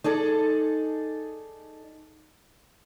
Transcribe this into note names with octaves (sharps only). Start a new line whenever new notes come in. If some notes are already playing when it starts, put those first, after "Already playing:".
D#4 G#4 A4 D5